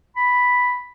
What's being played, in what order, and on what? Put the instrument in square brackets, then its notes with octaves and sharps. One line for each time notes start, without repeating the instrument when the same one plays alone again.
[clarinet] B5